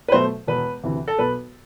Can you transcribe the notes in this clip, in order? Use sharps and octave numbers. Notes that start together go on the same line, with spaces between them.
B4
B2 F#3 A3 C5
E1 B4
D2 C3 E3
A4
B1 B4